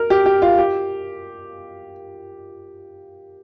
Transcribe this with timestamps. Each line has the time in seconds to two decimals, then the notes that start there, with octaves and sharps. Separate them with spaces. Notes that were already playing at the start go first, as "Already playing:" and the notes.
Already playing: A#4
0.10 G4
0.26 G4
0.42 F4
0.58 G4